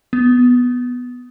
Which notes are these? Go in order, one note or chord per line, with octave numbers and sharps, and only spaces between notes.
B3